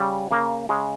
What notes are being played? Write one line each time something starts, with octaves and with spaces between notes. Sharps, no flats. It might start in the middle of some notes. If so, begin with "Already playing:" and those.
Already playing: C#3 G3
C#3 A#3
C#3 G#3